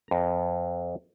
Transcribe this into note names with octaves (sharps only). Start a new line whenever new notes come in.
F2 A#5